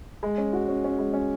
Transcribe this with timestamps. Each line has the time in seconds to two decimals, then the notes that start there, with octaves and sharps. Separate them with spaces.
0.23 G#3
0.38 C#4
0.53 F#4
0.68 C#4
0.84 C#4
0.99 G#3
1.14 C#4